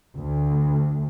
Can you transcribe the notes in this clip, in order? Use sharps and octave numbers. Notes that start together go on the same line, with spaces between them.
D2